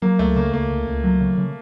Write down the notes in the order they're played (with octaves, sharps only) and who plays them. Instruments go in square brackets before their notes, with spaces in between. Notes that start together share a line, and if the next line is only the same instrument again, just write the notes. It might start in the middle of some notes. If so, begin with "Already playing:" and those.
[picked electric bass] F#3 [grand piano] A#3
[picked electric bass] C#2 [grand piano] A3
[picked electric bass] C#3 [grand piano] A#3
[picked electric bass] C#2 [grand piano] A#3
[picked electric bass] C#2
C#2
F#3
C#3
C#3